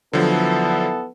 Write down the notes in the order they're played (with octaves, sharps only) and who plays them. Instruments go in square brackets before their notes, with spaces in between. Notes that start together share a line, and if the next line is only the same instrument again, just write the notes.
[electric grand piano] D3 F3 F#3 [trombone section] B3 E4 A4